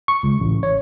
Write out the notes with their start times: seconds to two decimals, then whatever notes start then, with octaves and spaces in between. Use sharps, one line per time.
0.08 C#6
0.23 C#2
0.40 A1
0.63 C#5